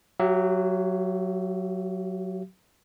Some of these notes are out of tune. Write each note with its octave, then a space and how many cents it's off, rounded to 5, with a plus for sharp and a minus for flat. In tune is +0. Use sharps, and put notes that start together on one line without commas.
F#3 +0 G4 -35 E5 +35